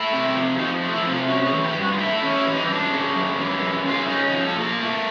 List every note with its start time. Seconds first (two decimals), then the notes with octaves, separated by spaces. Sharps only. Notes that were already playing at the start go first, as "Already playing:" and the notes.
Already playing: A3 E4
0.12 C3
0.35 F2
0.58 F3 D#4
0.82 A3
0.94 E4
1.06 C3
1.11 F4
1.28 C#4 F#4
1.46 G#4
1.52 E3
1.64 G4
1.76 G2
1.81 F#4
1.92 F4
1.98 A3 E4
2.17 E4
2.22 C#4
2.34 E4
2.45 E3
2.52 D#4
2.69 F#2 D4
2.92 C#3
3.16 F#2
3.38 E3
3.62 F#2
3.85 C#3 F4
3.98 E4
4.08 C#4 D#4
4.26 D#4
4.32 F3
4.43 A4
4.55 A#2
4.61 A#4
4.79 A3